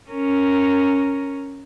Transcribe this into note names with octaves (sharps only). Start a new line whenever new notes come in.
C#4 A#4